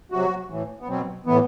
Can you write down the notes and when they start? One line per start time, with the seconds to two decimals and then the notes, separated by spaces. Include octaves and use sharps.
0.12 C3 F#3 F#4
0.50 A2 E3
0.81 B3
0.88 B2 F#3 C4
1.26 A2 E3 B3